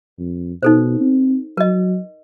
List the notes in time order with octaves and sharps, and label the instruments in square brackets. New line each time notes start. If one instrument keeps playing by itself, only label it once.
[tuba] F2
[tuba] B2 [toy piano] D#4 A4 C5
[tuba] C4
[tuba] F#3 [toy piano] A#4 D#5